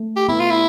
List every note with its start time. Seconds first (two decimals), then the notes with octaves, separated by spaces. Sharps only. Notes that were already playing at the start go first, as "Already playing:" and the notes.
Already playing: A3
0.16 G4
0.28 B3 E4
0.40 F4
0.51 E4